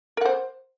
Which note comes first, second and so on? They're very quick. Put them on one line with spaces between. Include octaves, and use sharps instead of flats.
A#4 F#5 C5